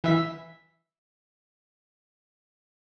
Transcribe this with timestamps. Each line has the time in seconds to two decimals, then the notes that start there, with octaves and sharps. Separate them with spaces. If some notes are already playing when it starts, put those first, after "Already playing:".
0.04 E3 E5 B6